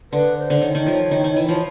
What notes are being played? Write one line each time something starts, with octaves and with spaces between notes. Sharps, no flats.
D3 B4
C5
D3
D#3 C#5
D#3
F3
D#3
D#3
E3
F3